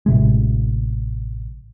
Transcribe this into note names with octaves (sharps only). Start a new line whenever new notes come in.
A1 C3 G#3